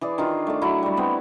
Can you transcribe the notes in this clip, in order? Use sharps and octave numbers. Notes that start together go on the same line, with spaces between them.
E3 G#4 D5
D#3 D4 F4
A3 D5
F#3 E4
G3 D5
B3 C4